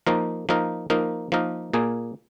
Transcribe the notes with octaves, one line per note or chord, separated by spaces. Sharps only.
F3 A#3 D#4 A#4
F3 A#3 D#4 A#4
F3 A#3 D#4 A#4
F3 A#3 D#4 A#4
A#2 A#3 G#4